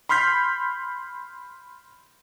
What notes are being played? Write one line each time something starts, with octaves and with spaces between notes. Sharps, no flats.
B5 C6 F6 G6 B6